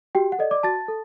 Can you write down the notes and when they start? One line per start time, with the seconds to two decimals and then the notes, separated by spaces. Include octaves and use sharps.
0.15 F#4 G4 G5
0.32 F#5
0.39 A4 D5 D#5
0.51 D5 D6
0.63 F#4 A5 A6
0.88 A4